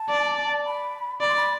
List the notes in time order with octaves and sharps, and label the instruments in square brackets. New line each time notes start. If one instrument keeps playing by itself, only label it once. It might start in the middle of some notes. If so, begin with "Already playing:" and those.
Already playing: [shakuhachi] A5
[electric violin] D5
[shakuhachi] B5
[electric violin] D5 [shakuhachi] B5
[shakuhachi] C6
B5